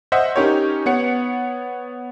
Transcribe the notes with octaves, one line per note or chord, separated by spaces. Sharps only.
C5 D#5 E5 F#5
C#4 D#4 G4 A#4 C#5
B3 C#5 F#5 C#7